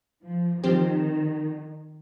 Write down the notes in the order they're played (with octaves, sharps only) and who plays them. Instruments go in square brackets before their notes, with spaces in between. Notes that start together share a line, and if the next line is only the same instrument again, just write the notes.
[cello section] F3
[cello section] D#3 [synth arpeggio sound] F3 C4 G4 C5